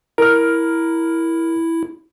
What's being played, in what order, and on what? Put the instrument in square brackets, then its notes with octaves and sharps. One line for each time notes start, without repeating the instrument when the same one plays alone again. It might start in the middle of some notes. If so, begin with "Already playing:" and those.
[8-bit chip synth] E4 [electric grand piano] A#4 F6